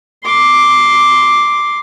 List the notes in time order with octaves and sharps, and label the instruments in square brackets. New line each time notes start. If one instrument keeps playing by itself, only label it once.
[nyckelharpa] C6 D6